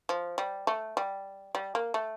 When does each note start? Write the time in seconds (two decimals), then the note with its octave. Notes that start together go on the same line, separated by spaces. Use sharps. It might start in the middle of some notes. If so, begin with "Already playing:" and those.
0.09 F3
0.38 G3
0.67 A3
0.97 G3
1.55 G3
1.75 A#3
1.94 A3